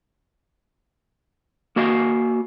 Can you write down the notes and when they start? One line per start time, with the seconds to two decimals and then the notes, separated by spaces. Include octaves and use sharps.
1.76 A#3 F#4 D#5 F5